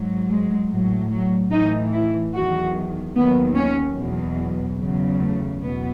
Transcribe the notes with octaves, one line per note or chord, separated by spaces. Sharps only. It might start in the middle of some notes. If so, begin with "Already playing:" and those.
Already playing: G#2 F#3
G#3
A2 F#3
F#3
A2 E3 D#4
E4
E2 D#3 F#3 F#4
D#2 D#3 F#3 B3
C#4
E2 B2 F#3
E2 C#3 F#3
A3
E2 B2 F#3 B3